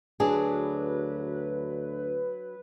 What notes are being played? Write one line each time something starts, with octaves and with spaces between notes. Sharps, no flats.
D2 F#3 D4 G#4 B4